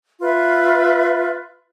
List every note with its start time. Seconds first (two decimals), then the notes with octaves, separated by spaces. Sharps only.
0.21 F4 B4 E5